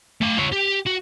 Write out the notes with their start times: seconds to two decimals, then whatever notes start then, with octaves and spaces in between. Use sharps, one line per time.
0.21 A3 F5
0.38 F4 C#5
0.53 G4
0.87 F#4